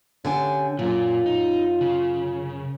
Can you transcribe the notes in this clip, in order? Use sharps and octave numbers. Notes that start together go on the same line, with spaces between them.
D3 C#4 G4 G#5
F#2 A#2 F4
D#4
C#3